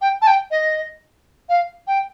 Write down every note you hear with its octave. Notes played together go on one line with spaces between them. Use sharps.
G5
A5
G5
D#5
F5
G5